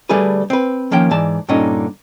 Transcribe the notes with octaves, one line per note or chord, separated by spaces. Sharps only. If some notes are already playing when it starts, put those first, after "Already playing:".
D3 G3 A3 D4 G#4 B4
C4 B4
D#3 F3 A#3 C#4 G5
G#2 E3 D5 A5
G2 A#2 D3 C#4 D#4